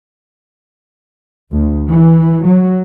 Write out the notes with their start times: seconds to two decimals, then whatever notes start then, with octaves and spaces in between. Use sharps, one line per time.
1.51 D2
1.88 E3
2.44 F#3